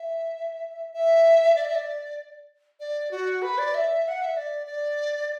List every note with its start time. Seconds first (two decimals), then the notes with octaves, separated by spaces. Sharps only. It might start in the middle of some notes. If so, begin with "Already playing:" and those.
Already playing: E5
0.93 E5
1.55 D5
1.65 E5
1.75 D5
2.80 D5
3.11 F#4
3.42 B4
3.58 D5
3.74 E5
4.08 F#5
4.22 E5
4.37 D5
4.67 D5